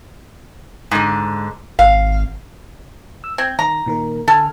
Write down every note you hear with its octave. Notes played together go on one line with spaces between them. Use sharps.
G#2 D3
G#1 F5
E6
C4 G6 G#6
D#3 A#5
A#2 D#3 A#4
D3 A4 G#5 F6